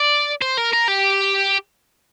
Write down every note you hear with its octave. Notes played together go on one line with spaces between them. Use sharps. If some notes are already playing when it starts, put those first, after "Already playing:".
Already playing: D5
C5
A#4
A#4
G4